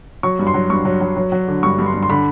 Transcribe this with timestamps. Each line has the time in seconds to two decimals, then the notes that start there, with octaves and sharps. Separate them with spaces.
0.23 F#3 C#6
0.39 G2
0.47 C6
0.54 F#3
0.70 G2 C#6
0.85 F#3
1.01 F#3
1.17 F#3
1.32 F#3
1.48 D3
1.63 G2 C#6
1.78 G2
1.86 C6
1.94 G2
2.03 C6
2.10 D3 B5